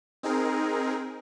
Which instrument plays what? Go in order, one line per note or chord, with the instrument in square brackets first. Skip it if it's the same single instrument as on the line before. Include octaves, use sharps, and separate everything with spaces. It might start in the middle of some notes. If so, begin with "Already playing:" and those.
[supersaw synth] C4 D#4 G#4 A#4